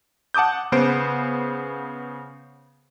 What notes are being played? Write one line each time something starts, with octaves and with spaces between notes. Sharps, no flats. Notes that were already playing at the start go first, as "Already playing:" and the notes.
F#5 A5 D6 D#6 G6
C#3 B3 C5 D7